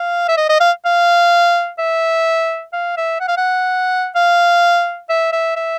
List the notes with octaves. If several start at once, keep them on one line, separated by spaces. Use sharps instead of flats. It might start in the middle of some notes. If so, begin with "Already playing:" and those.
Already playing: F5
E5
D#5
D#5
F5
F5
E5
F5
E5
F#5
F5
F#5
F5
E5
E5
E5